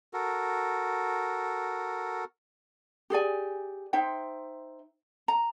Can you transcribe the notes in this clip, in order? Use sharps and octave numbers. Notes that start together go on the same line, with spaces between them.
F#4 A4 A#4
G4 G#4 D5 G#5
D#4 C5 E5 G5
A#5